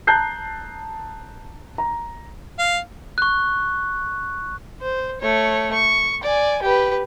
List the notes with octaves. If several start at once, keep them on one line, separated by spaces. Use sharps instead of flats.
A5 A#5 F#6 G6 C7
A#5
F5
C#6 F#6
C5
A3 C#5
C#6
D5 G#5
G4 B4